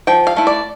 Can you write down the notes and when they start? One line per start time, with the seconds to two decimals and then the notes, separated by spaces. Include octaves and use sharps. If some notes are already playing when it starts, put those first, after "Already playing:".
0.07 F3 G5
0.27 F5
0.37 A3 E4
0.47 D5